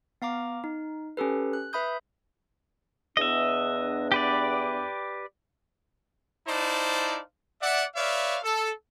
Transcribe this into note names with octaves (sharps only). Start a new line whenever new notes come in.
B3 F5 A#5 D6
D#4
C#4 G4 A4 B4
F#6
B4 E5 B5 D#6 G6
E2 B3 D4 D#5 E5
G4 B4 D5
D#4 E4 C5 D5 F5 A5
D5 E5 F#5
B4 C#5 D5 E5 F5
A4